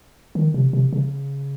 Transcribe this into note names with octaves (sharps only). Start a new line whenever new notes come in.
D#3
C3
C3
C#3